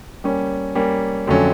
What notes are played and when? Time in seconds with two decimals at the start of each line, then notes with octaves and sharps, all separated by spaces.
0.24 G3 A#3 C#4
0.75 G3 A#3 C#4
1.27 F2 D3 F#3 A3 C#4